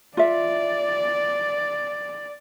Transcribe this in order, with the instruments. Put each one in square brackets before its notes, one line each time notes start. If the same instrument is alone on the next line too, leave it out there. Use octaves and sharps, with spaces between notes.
[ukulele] F4 E5 [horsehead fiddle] D5